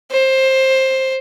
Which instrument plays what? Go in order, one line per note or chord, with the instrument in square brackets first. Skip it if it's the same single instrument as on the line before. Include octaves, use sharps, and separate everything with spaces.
[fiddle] C5